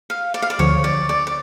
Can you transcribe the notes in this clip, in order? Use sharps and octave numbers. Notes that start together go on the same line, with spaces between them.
F5
D5
F5
D5
D2 D3 F3 C#5
D5
D5
D5